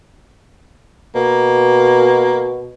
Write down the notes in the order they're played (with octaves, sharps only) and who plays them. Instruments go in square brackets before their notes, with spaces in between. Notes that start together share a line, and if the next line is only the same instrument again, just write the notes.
[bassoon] B2 [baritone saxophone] A#3